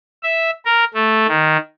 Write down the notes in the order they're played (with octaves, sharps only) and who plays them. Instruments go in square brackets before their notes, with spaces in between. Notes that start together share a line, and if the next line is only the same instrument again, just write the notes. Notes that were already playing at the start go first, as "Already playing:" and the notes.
[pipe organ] E5
A#4
A3
D#3